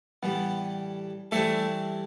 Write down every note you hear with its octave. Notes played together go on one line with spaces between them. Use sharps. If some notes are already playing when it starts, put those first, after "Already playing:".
A2 E3 G3 B3
E3 G3 A3 C4 E4 A4